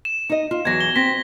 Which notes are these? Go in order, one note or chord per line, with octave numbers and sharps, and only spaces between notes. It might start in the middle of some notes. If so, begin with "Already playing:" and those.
E7
D#4 D#5
F4
E2 F#3 G#6 A#6
G7
C4 A#6 B6